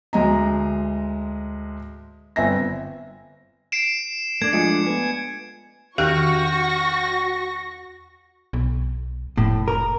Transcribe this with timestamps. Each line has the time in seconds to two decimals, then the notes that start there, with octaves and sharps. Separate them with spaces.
0.13 D2 G#3 D#5 A#5
2.36 G1 C4 E5 G#5 A#6
3.72 C7 D7 E7
4.42 A3 D4 G#6
4.53 F3 G#3 C#7
4.86 B3 G#5
5.98 E2 D#3 F#4 G4 C#6 F#6 A#6
8.53 B1
9.37 F1 A2
9.68 A#4